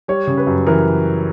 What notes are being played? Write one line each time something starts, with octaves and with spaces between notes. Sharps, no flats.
G3 C#5
C#3
B4
F#2
E3 A#4